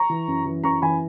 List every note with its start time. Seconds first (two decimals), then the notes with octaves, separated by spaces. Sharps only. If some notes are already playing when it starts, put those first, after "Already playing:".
Already playing: A#5 C#6
0.10 E3
0.28 F#2
0.46 E3
0.63 F#2 A#5 C#6
0.82 E3 G#5 B5